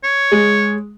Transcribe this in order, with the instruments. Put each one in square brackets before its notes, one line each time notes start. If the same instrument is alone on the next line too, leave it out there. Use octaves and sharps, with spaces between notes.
[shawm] C#5
[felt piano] G#3